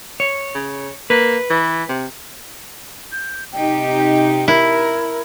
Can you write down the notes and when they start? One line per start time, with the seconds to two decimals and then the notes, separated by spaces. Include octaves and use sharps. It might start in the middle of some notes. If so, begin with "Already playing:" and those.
0.20 C#5
0.55 C#3
1.10 A#3 B4
1.50 E3
1.89 C3
3.12 G6
3.52 C3 D#4 G4 G5
4.48 E4 A#4